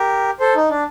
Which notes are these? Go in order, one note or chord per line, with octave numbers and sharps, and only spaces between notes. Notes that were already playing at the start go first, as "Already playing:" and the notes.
Already playing: G4 A#4
A4 C5
D#4
D4